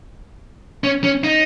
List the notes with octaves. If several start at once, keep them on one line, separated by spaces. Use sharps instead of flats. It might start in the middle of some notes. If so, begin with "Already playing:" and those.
C#4
C#4
D#4